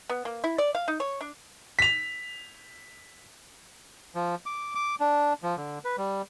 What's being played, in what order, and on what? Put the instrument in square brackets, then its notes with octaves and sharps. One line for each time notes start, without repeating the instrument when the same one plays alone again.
[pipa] B3
A#3
E4
D5
F5
D#4
C#5
D4
[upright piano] B6 F7
[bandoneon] F3
D6
D6
D4
F3
D3
B4
G3